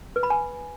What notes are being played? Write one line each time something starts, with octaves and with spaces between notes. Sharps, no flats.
B4
B5
G#5